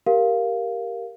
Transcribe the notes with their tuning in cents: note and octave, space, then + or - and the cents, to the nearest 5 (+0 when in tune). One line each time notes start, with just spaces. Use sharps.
G4 +0 A#4 +0 F5 +0